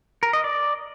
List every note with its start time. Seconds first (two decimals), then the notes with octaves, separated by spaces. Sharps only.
0.23 A#4
0.33 D#5
0.44 D5